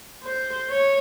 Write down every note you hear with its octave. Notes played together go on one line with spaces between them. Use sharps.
C5
C#5